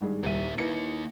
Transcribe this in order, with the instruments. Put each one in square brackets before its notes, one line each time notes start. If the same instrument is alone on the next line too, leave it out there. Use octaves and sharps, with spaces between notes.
[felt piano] G#1 G2 G#4
[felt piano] D#1 C2 D#7 [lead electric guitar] A#2 E5
[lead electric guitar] A#3 D#4 [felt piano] E4 B4 C#7